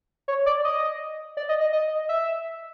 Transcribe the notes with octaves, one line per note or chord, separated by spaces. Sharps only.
C#5
D5
D#5
D5
D#5
D#5
D#5
E5